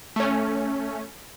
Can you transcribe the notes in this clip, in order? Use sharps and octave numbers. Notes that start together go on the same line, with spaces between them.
A3 C#4